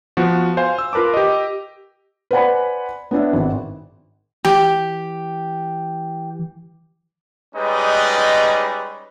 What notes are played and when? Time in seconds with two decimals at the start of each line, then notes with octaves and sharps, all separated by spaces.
0.17 F3 B3 F#4
0.57 C5 F5 G#5
0.79 E6
0.93 F4 A#4 B4 A5 D6
1.14 G4 D#5
2.31 B4 C5 D5 F#5 G#5 B5
3.11 B3 C#4 D4 E5
3.33 G#1
4.45 E3 G4
7.55 G3 G#3 C#4 D#4 B4